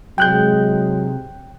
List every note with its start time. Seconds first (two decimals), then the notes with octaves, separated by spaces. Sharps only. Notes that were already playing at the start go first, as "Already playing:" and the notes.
0.18 G#2 C3 F#3 G#3 G5 F#6 G6